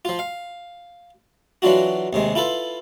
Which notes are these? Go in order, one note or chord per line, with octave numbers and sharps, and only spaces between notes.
F3 F4
F5
E3 F#3 D4 F4 F#4
D#2 C3 G#3
E4 F4 A4 B4